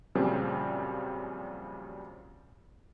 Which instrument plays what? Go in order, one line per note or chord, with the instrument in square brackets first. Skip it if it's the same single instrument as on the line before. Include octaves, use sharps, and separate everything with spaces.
[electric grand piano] F#2 A#2 C#3 F3 G3 C4